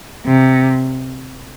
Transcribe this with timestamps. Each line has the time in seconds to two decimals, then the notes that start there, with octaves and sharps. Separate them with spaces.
0.26 C3